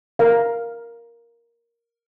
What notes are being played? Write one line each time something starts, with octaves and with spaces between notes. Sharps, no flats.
A#4 F5